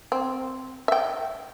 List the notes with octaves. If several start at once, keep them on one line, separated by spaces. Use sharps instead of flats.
C4
E5 G5